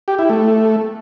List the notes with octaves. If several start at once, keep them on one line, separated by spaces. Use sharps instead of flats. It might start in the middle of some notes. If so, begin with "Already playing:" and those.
G4
E4
A3